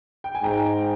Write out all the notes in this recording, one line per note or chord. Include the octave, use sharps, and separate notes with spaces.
G5
G#5
G#2 G5 A#5